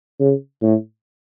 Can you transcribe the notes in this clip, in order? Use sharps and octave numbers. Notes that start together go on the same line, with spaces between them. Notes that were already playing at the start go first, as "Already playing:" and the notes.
C#3
A2